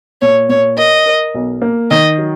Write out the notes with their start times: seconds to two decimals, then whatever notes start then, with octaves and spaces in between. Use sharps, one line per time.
0.21 A#2 C#5
0.49 A#2 C#5
0.77 A#4 D#5
1.06 A#4
1.34 B1
1.62 A#3
1.91 D#3 D#5
2.18 F#3